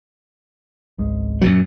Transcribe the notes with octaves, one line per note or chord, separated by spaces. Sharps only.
G#1 C#2 G#3
F#2 A#2 F#3